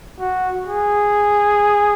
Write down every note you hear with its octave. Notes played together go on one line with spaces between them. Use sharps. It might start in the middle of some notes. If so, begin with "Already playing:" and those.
F#4
G#4